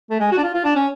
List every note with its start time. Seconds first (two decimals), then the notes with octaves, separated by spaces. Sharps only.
0.10 A3
0.20 G#3
0.31 F#4
0.38 D4
0.43 F4
0.54 F4
0.64 D4
0.76 C#4